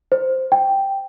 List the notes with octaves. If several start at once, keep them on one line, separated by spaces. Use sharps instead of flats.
C5
G5